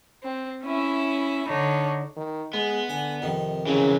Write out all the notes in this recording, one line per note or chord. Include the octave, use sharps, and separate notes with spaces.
C4
C#4 E4 E5
D3 D4 D#4 C#5
D#3
G#3 B3
D3 G#5
F2 C3 D#3
C#3 E3 F#3